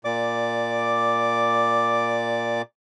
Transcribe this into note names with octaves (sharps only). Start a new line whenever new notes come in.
A#2 D5 D6